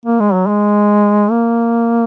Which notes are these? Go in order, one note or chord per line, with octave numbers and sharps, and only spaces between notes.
A#3
G#3
F#3
G#3
A#3